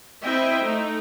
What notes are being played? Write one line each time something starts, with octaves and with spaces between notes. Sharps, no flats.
C4 E4 C5 D#5 E5 G5
A3 D#4